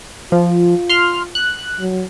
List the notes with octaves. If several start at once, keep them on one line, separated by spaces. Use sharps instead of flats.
F3 F4
C6 F6
F#6
F#3